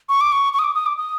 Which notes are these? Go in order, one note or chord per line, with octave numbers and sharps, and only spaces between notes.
C#6
D6
C#6
C#6
D#6
D6
D#6
D6
D#6